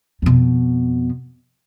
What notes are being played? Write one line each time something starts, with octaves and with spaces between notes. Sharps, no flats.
F2 B2